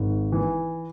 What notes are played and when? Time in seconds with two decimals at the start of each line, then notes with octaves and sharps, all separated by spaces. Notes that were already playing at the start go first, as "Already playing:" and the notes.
Already playing: G#1
0.32 E3